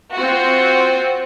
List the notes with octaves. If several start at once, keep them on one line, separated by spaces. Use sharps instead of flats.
C4 F4 F#4